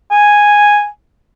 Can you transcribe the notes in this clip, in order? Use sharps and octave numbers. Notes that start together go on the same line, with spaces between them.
G#5